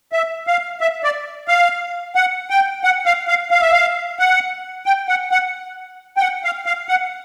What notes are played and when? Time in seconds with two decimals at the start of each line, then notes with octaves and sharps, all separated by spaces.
0.12 E5
0.47 F5
0.81 E5
1.04 D5
1.48 F5
2.15 F#5
2.50 G5
2.84 F#5
3.06 F5
3.28 F5
3.51 F5
3.61 E5
3.72 F5
4.19 F#5
4.86 G5
5.08 F#5
5.31 F#5
6.17 G5
6.21 F#5
6.44 F5
6.66 F5
6.89 F#5